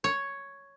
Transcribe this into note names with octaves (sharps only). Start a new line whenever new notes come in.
C#5